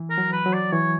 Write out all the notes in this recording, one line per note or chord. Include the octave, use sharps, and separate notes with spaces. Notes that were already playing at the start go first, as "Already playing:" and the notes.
Already playing: E3
A#4
F#3
B4
F#3
D5
E3 C#5